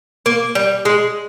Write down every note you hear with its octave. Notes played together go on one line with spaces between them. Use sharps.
A#3
G3
G#3